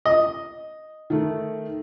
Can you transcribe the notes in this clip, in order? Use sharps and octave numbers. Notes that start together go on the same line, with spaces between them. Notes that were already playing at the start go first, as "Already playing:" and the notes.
D#5
D#3 A3